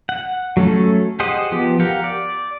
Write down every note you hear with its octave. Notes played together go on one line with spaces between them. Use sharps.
F#5
F#3 A3 C#4 A4
G4 G#4 C5 D#5 F#5
F3 B3 G4
G4 A#4 F5 F#5
D5